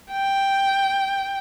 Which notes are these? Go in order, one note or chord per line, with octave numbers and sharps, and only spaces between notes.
G5